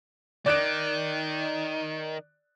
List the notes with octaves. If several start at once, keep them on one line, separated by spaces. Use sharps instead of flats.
D#3 D5 F#6 D7